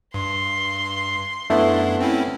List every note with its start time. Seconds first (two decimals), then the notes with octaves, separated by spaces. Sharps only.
0.14 G2 C6
1.50 F#2 A3 B3 D4 E4
2.01 C4 C#4 E4